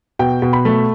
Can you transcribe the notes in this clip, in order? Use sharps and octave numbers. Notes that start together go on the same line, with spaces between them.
B2 G5
B2
B5
A3